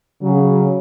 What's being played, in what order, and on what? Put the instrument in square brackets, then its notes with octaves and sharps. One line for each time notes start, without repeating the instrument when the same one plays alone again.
[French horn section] C#3 F#3